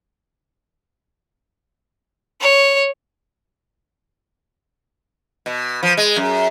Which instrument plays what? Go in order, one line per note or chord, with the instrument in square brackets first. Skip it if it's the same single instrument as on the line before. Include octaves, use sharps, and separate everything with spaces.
[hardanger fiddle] C#5
[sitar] B2
F3
G#3
F#2